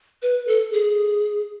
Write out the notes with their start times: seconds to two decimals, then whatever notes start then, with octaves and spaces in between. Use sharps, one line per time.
0.22 B4
0.48 A4
0.73 G#4